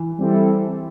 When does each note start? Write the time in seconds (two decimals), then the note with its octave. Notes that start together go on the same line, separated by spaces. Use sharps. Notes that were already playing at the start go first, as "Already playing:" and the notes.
Already playing: E3
0.18 G3 C4 E4 A4